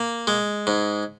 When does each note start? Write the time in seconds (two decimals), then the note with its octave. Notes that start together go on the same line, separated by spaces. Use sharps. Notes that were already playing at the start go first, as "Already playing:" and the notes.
Already playing: A#3
0.27 G#3
0.67 G#2